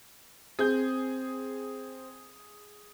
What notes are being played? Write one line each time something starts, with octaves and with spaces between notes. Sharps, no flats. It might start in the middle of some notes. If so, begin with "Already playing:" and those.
C4 G#4 G6